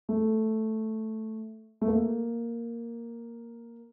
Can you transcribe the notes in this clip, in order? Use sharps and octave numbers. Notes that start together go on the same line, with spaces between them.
A3
A3
A#3